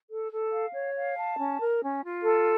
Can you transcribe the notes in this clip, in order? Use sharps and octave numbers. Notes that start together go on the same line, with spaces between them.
A4
A4
F5
C#5
F5
A5
C#4
A#4
C#4
F4
A4